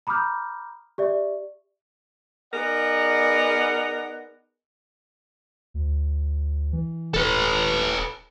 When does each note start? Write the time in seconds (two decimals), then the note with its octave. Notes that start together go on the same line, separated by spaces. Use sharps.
0.07 A#5 B5 D6 D#6 F6 G6
0.98 G4 D5 E5
2.54 B3 D#4 G#4 A#4 D5 F#5
5.74 D2
6.72 E3
7.14 D#1 A4 B4